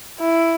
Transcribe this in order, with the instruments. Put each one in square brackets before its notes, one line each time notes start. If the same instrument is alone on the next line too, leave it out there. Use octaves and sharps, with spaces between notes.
[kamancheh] E4